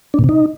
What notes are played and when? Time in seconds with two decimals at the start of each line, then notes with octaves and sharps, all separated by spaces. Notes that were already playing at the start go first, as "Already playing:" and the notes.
0.14 D4
0.19 A#2
0.24 C3
0.29 D#4